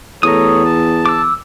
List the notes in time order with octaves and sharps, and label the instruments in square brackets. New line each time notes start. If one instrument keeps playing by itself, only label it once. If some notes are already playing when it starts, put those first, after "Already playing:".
[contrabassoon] E2 [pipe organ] A3 A4 C#5 [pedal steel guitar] A#5 D#6
[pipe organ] A5
[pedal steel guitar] D6 E6